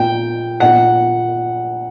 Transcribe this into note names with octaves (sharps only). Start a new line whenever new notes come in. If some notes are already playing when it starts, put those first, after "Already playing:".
Already playing: A#2 G5
A#2 F#5